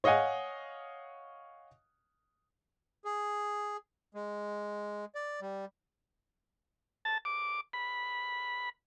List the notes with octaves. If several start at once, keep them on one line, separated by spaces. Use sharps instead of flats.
C#5 D#5 F5 F#5 G#5
G#4
G#3
D5
G3
A5
D6
B5